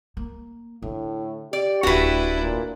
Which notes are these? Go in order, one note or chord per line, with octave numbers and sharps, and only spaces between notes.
A#3
A2 D3
G4 D5
D1 A3 D4 E4 F#4 B4
A#2